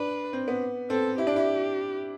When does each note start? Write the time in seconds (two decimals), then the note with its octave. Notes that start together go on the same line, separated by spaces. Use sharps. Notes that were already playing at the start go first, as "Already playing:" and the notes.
Already playing: D4 B4
0.33 C4
0.48 B3
0.90 C4 A4
1.18 E4 G4
1.27 D4
1.36 E4